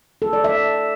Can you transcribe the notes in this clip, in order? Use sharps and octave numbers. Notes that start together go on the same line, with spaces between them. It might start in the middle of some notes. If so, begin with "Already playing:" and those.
A4
D5
E5